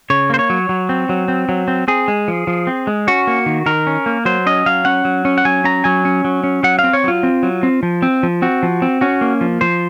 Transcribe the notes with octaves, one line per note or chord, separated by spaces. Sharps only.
C#3 C#5
A#3 C5
C#5
F#3
F#3
C4
F#3
C4
F#3
C4
C4 G#4
G#3
F3
F3
C4
G#3
C#4 F#4
A#3
D#3
D#3 A#4
C#4
A#3
F#3 C5
C#4 D#5
F#3 F5
C#4 F#5
F#3
C#4
F#5
F#3 G#5
C#4 A#5
F#3 G#5
C#4
F#3
C#4
F#3 F#5
F5
C4
C#5
F#3 F4
C4
F#3
C4
F3
C4
F3
C4 F#4
F3
C4
C#4 F#4
A#3
F3
F3 C5